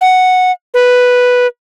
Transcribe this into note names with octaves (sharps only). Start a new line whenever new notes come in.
F#5
B4